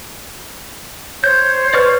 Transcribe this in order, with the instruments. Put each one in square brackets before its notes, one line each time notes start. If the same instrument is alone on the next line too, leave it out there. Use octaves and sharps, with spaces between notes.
[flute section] C5 C#5 [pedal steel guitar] G6
[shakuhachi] B4 [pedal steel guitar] D5 C#6 F6